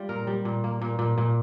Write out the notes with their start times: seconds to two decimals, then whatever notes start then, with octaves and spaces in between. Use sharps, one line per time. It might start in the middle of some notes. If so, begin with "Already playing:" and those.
Already playing: G3 F4
0.09 A#2 A#4
0.27 G3
0.45 A#2
0.64 A#3
0.81 A#2
0.99 A#2
1.18 A#2